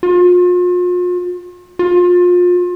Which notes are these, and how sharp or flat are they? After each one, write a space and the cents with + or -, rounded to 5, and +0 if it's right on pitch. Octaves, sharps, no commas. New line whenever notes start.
F4 +40
F4 +30